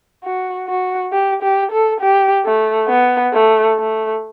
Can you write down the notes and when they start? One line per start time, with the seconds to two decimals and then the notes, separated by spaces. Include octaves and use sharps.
0.24 F#4
0.68 F#4
1.12 G4
1.43 G4
1.72 A4
2.01 G4
2.45 A3
2.89 B3
3.33 A3
3.78 A3